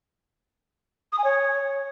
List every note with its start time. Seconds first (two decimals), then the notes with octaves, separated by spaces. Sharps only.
1.12 D#6
1.18 G#5
1.24 C#5